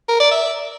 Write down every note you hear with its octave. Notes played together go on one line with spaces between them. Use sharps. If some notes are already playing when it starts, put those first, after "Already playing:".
A#4
D5
E5